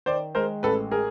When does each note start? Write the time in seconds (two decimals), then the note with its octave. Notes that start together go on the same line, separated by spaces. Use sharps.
0.06 D#3 C5 D5
0.35 G#3 A#4 C5
0.63 A1 A4 B4
0.91 G#4 A#4